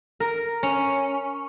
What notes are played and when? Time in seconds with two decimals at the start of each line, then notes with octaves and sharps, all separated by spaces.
0.20 A#4
0.63 C#4